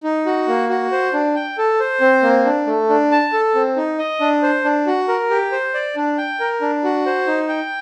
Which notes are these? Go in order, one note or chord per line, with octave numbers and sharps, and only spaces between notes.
D#4
F#4
A#3
F#4
C5
D4
G5
A4
C5
C4
A#3
D4
A3
D4
A5
A4
C4
D#4
D#5
D4
C5
D4
F#4
A#4
G4
C5
D5
D4
G5
A#4
D4
F#4
C5
D#4
G5